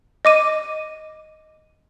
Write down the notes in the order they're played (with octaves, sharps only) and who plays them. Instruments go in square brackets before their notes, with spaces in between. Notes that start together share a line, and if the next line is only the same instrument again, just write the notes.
[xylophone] D#5 D6 D#7